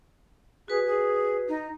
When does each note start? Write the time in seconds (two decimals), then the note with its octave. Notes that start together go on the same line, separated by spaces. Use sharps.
0.68 F#4 G#4 B4
0.86 G#4
1.48 D#4